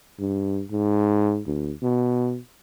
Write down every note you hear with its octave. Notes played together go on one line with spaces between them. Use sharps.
G2
G#2
D2
B2